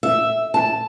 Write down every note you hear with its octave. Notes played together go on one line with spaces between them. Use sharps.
E5
A5